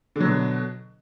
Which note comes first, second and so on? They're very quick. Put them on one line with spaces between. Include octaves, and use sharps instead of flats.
D3 F#3 B2